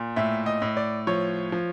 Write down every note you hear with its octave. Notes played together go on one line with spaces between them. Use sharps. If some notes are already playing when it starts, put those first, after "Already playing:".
Already playing: A#2
A2 E5
D#5
A2
D5
F3 C#5
F3